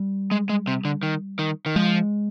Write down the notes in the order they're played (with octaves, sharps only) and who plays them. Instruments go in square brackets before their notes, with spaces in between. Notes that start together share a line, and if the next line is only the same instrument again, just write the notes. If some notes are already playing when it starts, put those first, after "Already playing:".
Already playing: [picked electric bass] G3
[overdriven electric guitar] G#3
G#3
C3
D3
D#3
D#3
D#3
[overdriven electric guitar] F3 [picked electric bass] G#3